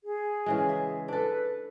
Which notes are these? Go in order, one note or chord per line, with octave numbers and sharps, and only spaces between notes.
G#4
C#3 E3 G#3
E5
D4 A4 B4